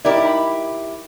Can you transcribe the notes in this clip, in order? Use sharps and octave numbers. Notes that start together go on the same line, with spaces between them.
D#4 E4 G4 A#4 D5
B5